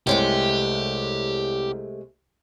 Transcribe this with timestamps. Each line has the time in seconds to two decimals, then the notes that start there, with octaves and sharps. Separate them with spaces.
0.07 C2 C3 G#3 A3 G4 C#5